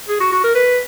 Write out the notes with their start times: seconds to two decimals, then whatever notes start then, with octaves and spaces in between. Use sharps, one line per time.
0.08 G#4
0.20 F#4
0.32 F#4
0.44 A#4
0.55 B4